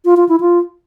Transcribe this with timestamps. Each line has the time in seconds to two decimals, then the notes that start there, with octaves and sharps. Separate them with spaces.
0.05 F4
0.17 F4
0.29 E4
0.40 F4